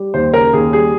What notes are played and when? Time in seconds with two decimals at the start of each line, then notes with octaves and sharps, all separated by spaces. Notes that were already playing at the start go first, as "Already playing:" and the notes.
Already playing: G3
0.14 D#2 C5
0.33 C#3 A#4
0.53 D#2 G#4
0.73 G3 G#4